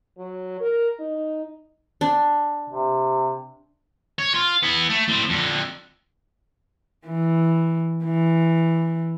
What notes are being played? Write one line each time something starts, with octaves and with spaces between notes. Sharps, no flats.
F#3
A#4
D#4
D4
C3
C#5
F4
B3 E4
A3
A2 C4
F2 D3
E3
E3